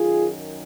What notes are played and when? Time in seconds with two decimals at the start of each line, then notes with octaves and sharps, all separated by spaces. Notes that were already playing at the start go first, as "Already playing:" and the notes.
Already playing: F#2 D#3 F4 G#4